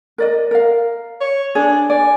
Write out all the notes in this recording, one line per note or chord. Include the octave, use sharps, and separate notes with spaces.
A#4 D5 D#5
A#4 F5
C#5
D4 G#4
D5 G#5